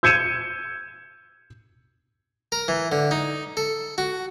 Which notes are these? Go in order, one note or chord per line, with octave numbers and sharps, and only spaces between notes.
E6 G6 G#6 C#7 D#7 E7
A#4
E3
D3
D#4
A4
F#4